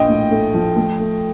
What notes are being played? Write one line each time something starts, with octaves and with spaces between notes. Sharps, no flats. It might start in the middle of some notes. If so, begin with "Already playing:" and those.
Already playing: A#1 D#5 G5
A2
A3
F3
A3
A3